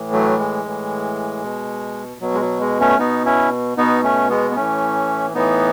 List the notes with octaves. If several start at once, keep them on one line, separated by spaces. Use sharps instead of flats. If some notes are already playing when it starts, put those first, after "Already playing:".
Already playing: A2 E3
F#3 A3
G#3
A2 E3
B2
B2 F#3
G#3
F#3
G#3
A3 C#4
B2 B3 D#4
C#4 E4
B2 B3 D#4
A3 C#4
G#3 B3
B3
A2 E3 A3 C#4
A2 E3 B3 D#4